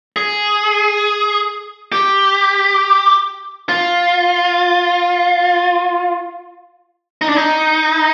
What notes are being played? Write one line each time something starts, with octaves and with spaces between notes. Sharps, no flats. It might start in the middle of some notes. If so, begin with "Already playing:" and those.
G#4
G4
F4
D#4
D4
D#4